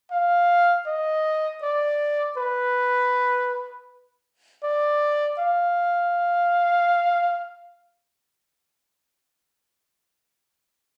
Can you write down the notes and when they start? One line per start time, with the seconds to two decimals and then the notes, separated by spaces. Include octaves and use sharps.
0.11 F5
0.86 D#5
1.63 D5
2.37 B4
4.64 D5
5.38 F5